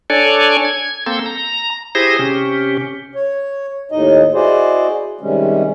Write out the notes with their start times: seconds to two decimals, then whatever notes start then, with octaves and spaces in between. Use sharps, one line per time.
0.10 D4 A4 C#5 D5 G#5
0.65 G#6
1.06 A#3 C4 A4 E6 G6
1.26 A#5
1.95 E4 G4 G#4 C5 D#6 A#6
2.19 C3 C#4 G4
3.15 C#5
3.92 D#2 A2 D#4 D#5
4.34 E4 F#4 G#4 C5 D5 D#5
5.21 C3 D#3 G3 G#3 C#4